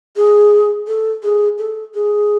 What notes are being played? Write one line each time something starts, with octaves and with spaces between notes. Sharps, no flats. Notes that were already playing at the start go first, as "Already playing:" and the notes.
G#4
A4
G#4
A4
G#4